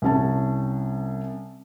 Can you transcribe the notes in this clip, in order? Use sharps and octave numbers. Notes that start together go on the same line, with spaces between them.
C2 C#4 A5